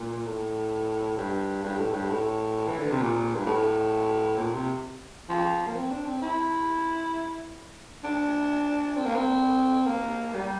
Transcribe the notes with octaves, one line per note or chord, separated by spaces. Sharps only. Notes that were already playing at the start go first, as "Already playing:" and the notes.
Already playing: A#2
A2
G2
G2
A2
G2
A2
E3
D3
C3
A#2
G2
A2
A#2
C3
F3
A#3
C4
D4
C4
E4
D4
C4
A#3
C4
A#3
G3